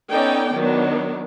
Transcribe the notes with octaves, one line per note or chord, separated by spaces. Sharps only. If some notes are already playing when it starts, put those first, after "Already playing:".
B3 C#4 D#4 A4 D5 G5
D#3 F#3 B3 D4